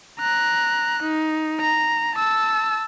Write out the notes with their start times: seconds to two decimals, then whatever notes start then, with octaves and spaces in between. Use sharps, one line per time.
0.20 A#5 F#6
1.03 D#4
1.60 A#5
2.15 A5 E6